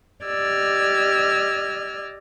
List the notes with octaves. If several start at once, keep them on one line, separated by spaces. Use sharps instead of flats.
G4 D5 D#5 E6 F6 G#6